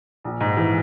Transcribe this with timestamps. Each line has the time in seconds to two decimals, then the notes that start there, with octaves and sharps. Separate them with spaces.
0.24 A#1
0.40 G#2
0.57 E3